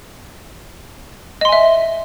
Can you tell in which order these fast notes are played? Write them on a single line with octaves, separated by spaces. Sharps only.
D#5 C6 G#5 E5